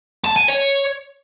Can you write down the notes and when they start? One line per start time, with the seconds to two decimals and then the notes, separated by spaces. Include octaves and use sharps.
0.25 A5
0.36 G#5
0.48 C#5